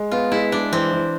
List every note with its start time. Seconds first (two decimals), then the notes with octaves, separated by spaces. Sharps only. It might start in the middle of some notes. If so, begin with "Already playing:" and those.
Already playing: G#3
0.11 B3 F4
0.32 G#3 E4
0.52 G#3 D4
0.72 E3 C4
0.93 E3